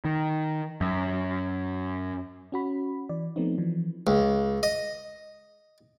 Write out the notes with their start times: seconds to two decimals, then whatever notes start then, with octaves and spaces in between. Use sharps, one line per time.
0.05 D#3
0.81 F#2
2.52 C#4 F#4 B5
3.09 E3 D5
3.36 F3 A3 B3 C4 D#4
3.58 E3 F3
4.07 C#2
4.63 D#5